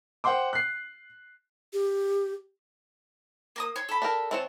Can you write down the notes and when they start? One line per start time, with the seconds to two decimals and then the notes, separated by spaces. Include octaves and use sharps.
0.24 C5 F#5 G5 C6 D6
0.53 F#6 C7
1.73 G4
3.56 A#3 A#5 D#6
3.76 C#5 C6
3.89 A4 B5
4.02 D4 G4 A#4
4.31 E3 C4 C#5 A5